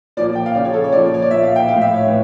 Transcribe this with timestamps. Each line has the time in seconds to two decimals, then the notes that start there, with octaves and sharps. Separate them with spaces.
0.17 A#2 F3 D5
0.35 G5
0.46 F5
0.55 C#3 F3 D5
0.65 C#5
0.73 A4
0.84 C#5
0.92 A#2 F3 D5
1.14 C#5
1.22 D5
1.31 A#2 F3 E5
1.43 F5
1.56 G5
1.68 F3 F5
1.73 A2
1.81 E5
1.94 C#5
2.06 A2 E3